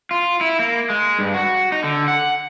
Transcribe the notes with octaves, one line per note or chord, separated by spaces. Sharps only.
F4
E4
A#3
G#3
G2
F#4
D#4
D3
F#5